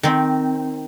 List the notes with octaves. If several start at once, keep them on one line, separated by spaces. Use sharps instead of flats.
D#3 C4